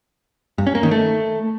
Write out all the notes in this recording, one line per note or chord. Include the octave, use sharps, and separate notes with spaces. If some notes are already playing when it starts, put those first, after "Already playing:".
G2
C#4
A#3
D#3
A3